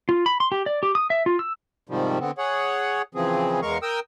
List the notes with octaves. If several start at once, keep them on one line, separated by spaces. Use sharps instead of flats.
F4
B5
C6
G4
D5
G4
D#6
E5
F4
E6
G#2 C3 D#3 F3 G3
D3 B3 C4
G#4 C#5 F#5
C#3 E3 F3 C4 G#4
E2 G#3 A#4 F5 C#6
A#4 G5 D#6 E6